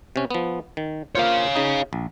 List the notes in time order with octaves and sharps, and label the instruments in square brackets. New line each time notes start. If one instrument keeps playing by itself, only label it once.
[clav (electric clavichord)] C3 C#4
F3 B3
D#3
[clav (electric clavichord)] A#3 F4 C5 [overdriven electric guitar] C#5 F5
[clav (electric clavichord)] C#3 D#4
A#1